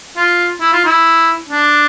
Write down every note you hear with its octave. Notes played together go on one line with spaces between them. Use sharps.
F4
E4
F4
E4
D4